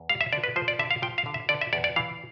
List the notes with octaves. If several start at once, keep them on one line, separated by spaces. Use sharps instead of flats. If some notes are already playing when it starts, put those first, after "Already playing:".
Already playing: E2
G3 F5
E5
D3 D5
B4
F3 C5
D5
D3 E5
F5
F3 G5
F5
D3
E5
D3 D5
E5
E2 D5
D5
E3 F5